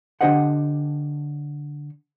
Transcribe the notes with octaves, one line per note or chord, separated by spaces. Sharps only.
D3 D4 G4 C5 D#5 F#5